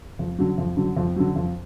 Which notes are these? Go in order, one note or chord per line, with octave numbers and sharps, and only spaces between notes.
F2
D3 F#3
F2
D3 F#3
F2
D3 F#3
F2